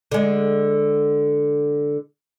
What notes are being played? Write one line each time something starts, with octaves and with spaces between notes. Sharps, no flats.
D3 G#3